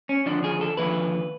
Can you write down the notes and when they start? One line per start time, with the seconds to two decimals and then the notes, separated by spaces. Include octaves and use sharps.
0.09 C#4
0.26 D#2 D3 F3 D4
0.44 G#4
0.61 A4
0.77 D#2 D3 F3 B4